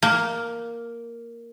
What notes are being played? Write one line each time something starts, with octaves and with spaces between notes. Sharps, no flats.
A#3